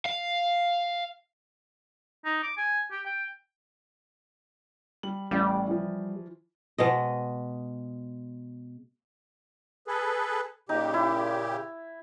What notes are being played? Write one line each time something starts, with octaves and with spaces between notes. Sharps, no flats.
F5
D#4
D6
G#5
G4
G5
G3 F#7
A1 A2 G3 D5
E3 F3
B2 G#3 D#5
G#4 A4 B4
A#2 C#3 D#4 G4
E4